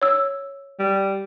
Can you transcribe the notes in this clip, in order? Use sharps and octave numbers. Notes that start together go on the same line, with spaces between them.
C#5 E6
G3